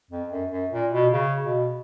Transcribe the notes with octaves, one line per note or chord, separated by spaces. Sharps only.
F2
F#2
F#2
A#2
B2
C#3
B2